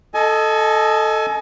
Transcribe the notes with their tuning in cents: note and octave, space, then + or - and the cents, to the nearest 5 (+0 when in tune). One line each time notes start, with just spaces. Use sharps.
A4 +0 D#5 +0 G#5 +30